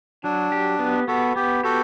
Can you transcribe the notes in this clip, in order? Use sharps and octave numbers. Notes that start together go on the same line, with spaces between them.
F#3 D4
G4
B3
B3 F#4 A4
B3 G4
F#4 G4 A4